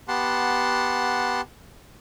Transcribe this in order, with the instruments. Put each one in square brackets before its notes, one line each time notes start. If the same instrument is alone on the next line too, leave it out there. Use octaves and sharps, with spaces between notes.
[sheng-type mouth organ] B3 G4 F#5 A5 C6